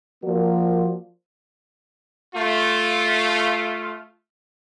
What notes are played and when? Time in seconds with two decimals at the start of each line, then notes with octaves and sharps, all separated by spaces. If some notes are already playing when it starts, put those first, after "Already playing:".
0.23 F3 A#3 F#4 A#4 D5
2.35 A3 F4